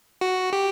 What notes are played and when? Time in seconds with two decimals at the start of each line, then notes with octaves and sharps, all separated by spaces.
0.21 F#4
0.53 G4